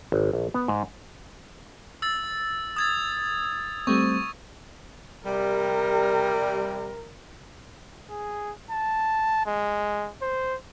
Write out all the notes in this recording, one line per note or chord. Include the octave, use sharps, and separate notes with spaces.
G#1
A#1
B3
G#2
E6 A6
D#6 E6 G#6 A6
G3 A3 C4 C#6
C3 G3 A#4
G#4
A5
G#3
C5